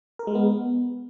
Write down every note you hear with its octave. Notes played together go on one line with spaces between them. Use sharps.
A#4
G#3
B3